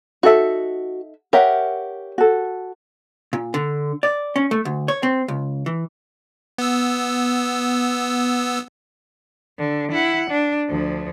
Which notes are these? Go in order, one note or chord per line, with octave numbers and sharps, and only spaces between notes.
D#4 F#4 A4 E5
G4 A#4 C#5 E5 F#5
F#4 A4
A#2
D3
D5
C#4
A3
D2
C#5
C4
C#2
E3
B3 E6
D3
E4 F#5
D4
D2 F3